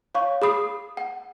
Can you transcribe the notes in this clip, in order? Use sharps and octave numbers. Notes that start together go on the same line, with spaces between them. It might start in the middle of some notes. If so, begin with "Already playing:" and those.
C#5 F5 C#6
G#4 B5 D#6 C7
F#5